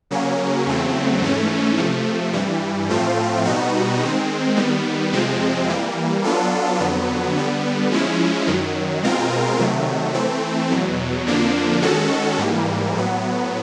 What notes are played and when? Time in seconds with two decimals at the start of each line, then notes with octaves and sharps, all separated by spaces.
0.11 C#3 F#3 A#3 C#4
0.66 E2 C#3 F#3 A3 C4
1.22 G#2 E3 A3 C#4
1.77 C3 F3 A3
2.33 G2 E3 G3
2.89 A2 F3 A3 C4 F4
3.45 B2 G3 B3 D#4 F#4
4.01 D#3 G#3 C4
4.56 D#3 G3 B3
5.12 F2 C3 F3 G#3 C4
5.69 E3 G3 A#3
6.24 F#3 B3 D4 F4 A4
6.80 F2 D3 F#3 B3
7.36 D3 G3 B3
7.92 F3 G#3 C#4 E4
8.47 F#2 D#3 F#3
9.03 B2 G#3 C4 F4 A#4
9.59 C3 D#3 F#3 A3
10.14 E3 A3 C4
10.70 E2 B2 F#3
11.26 F2 D3 F3 A#3 D4
11.82 D#3 G#3 C#4 F#4 A4
12.38 G#2 E3 G3 A#3
12.94 A2 F#3 B3